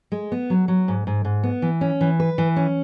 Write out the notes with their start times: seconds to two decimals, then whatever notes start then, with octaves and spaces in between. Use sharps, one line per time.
0.12 G#3
0.32 B3
0.50 F#3
0.68 F#3
0.88 G#2
1.07 G#2
1.25 G#2
1.43 B3
1.62 E3
1.81 C#4
2.01 E3
2.20 B4
2.38 E3
2.56 C#4